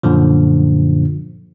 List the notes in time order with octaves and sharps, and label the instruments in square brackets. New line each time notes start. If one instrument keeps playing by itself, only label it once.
[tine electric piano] F#2 A#2 D3 F3